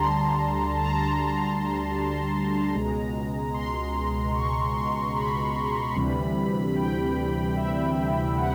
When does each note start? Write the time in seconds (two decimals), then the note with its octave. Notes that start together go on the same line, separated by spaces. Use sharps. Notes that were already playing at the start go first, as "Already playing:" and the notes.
Already playing: D2 D3 G3 A5 A#5 C6
0.14 C6
0.74 A5
0.84 A#5
0.94 A5
1.14 A5
1.54 A#5
2.75 C#2 B2 G#3
3.54 C6
4.35 C#6
4.75 C6
5.15 B5
5.96 D2 C3 E3 G3
6.76 G5
7.56 E5
8.37 F#5